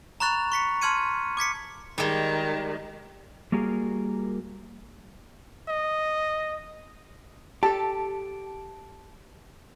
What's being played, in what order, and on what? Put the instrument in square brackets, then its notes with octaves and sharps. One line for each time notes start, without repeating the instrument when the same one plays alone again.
[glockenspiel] A#5 B5 C#6 F#6 A6 F7
C#6 B6 C#7
A5 C6 F6 G#6 C#7 D#7
D6 G#6 B6 C#7
[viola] D#3 [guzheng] G3 G#3
[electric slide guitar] G3 A#3 F#4 G#4 A#4
[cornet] D#5
[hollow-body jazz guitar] G4 A4 [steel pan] A5